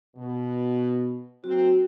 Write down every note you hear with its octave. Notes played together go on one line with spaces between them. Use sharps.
B2
F#3 A#3 C4 F#4